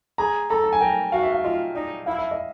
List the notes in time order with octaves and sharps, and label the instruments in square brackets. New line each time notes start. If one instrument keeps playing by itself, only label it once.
[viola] G#4 [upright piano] A#5
[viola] A4 [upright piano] A#5
[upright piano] A5
G#5
[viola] A#4 [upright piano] G5
[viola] F#4 [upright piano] F5
[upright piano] E5
F5
[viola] F4 [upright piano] D#5
[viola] D#4 [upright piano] D5
[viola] E4 [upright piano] F5
[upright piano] E5
D#5